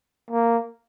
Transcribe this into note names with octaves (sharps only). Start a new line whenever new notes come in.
A#3